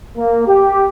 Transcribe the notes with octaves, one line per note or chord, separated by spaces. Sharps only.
A#3
G4